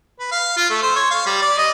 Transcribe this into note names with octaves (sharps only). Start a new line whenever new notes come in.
B4
F5
F4
A3
C5
C#5
F5
G3
D5
D#5